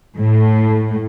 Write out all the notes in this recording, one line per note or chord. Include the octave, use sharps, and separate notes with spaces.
A2